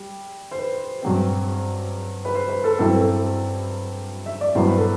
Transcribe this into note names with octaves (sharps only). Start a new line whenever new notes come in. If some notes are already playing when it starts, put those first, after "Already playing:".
Already playing: G3
C5
B4
G2 F#3 C4
C5
B4
C5
B4
A4
G2 F#3 C4 E4 A4
A4
E5
D5
G2 F#3 B3 E4 C5
B4
A4